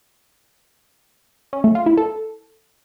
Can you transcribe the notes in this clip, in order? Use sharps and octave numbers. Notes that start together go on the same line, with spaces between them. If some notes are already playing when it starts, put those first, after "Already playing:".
C#4
A3
F4
E4
A4